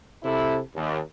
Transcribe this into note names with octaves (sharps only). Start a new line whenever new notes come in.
C3 E4 A4
D#2